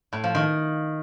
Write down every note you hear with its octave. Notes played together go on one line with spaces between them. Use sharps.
A2
F3
D#3